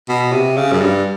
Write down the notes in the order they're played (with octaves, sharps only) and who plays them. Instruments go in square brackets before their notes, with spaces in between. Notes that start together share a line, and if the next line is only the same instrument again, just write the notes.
[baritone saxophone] B2
C3
C#3
F#2
G2